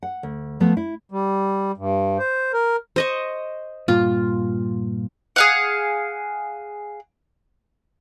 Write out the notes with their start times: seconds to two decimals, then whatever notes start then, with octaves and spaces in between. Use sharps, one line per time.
0.03 F#5
0.23 D2
0.60 F3 A3 B3
0.77 E4
1.11 G3
1.77 G2
2.18 C5
2.54 A#4
2.96 C5 D#5 C#6
3.88 G2 A#2 F4
5.36 G#4 F5 F#5